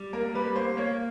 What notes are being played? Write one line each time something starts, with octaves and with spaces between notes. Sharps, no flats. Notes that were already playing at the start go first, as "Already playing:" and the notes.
Already playing: G3
A#3 A#4
G3 B4
A#3 C5
A#3 C#5